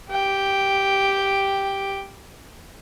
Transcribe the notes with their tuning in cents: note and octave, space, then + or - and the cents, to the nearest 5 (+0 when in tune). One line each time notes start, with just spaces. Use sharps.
G4 +0 G5 +0